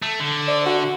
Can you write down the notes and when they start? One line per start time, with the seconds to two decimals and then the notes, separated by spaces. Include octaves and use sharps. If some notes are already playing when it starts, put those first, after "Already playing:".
0.02 A3
0.20 D3
0.48 D5
0.66 F#4